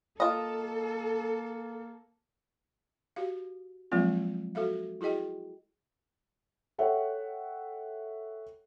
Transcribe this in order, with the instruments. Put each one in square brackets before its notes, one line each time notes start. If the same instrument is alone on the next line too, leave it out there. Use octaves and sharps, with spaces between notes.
[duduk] A#3 [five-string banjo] F4 D#5 [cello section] A4
[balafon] F#4 G4 F5
F3 F#3 G#3 A#3 C4 F4
F#4 A4 E5 F5
E4 F#4 G#4 D#5 G5
[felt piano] A4 C#5 E5 F#5 G5